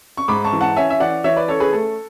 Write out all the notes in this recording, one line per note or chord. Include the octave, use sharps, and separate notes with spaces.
C#6
G#2 B5 D6
A5 C#6
E3
F#5 A5
C#4 E5 G#5
E5
E3 D5 F#5
E3 C#5 E5
B4 D5
C#4 A4 C#5
G#4 B4
A3 A4